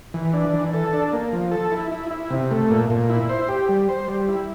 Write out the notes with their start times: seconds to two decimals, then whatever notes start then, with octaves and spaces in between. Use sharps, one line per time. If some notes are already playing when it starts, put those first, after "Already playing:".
0.14 E3
0.33 D4
0.53 E3
0.73 A4
0.93 D4
1.13 A#3
1.33 F3
1.51 A4
1.72 E4
1.92 E4
2.10 E4
2.30 C3
2.51 A3
2.70 A#2
2.90 A#2
3.10 E4
3.29 C5
3.48 G4
3.69 G3
3.89 C5
4.08 G3
4.28 E4